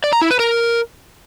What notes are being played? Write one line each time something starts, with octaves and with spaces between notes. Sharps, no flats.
D5
A#5
E4
B4
A#4